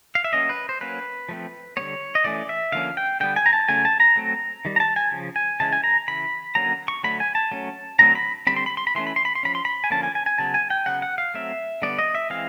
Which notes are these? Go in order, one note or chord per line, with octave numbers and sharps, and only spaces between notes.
F5
E5
F#3 A#3 C#4 D#5
B4
C5
F#3 A#3 C#4 B4
F3 A3 C4
D3 G3 B3 C#5
D#5
E3 A3 C#4 D5
E5
D3 F3 A#3 C#4 F5
G5
D3 G3 B3 G5
G#5
A#5
A5
C#3 F#3 A3 C#4 G#5
A5
A#5
F#3 A3 C4
D#3 G3
A#5
A5
G#5
C#3 F3
G#5
C#3 E3 G#3 C#4 A5
G#5
A#5
C#3 E3 B5
D3 F#3 A#3 C#4 A#5
C#6
D3 F#3 A3 B5
G#5
A5
F#3 A3 C#4
D3 F#3 A3 C4 A#5
B5
D3 G3 C4 B5
C6
B5
C6
B5
E3 A3 C#4 C6
B5
C6
B5
C6
F3 A3 C#4 B5
C6
B5
G#5
D3 F3 A#3 C#4 A5
G#5
G#5
G#5
C#3 F#3 B3 A5
G#5
G5
C#3 F#3 B3 F#5
F#5
F5
F#3 A3 C4 E5
D3 G3 B3 D5
D#5
E5
E3 G#3 C4 F5